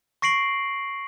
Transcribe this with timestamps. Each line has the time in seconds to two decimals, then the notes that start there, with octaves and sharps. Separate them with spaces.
0.22 C#6 A#6 C7 D7 F#7